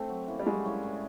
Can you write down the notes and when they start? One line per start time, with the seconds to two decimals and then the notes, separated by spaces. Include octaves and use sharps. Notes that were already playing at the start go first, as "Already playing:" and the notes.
Already playing: A3 C4
0.09 F#3
0.28 A#3 C#4 E4
0.40 G3
0.46 F#3 G#3
0.65 A#3 C#4 E4
0.83 A2